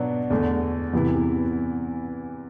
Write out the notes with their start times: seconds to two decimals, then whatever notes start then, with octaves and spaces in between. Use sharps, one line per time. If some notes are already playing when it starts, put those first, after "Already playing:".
Already playing: B2 F#3 B3 D4 F#4
0.30 E2 D3 A3
0.93 E2 C3 E3 B3 E4